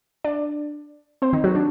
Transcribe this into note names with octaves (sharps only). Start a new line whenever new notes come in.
D4 D5
C4 C5
D#3 D#4
F#3 F#4
D4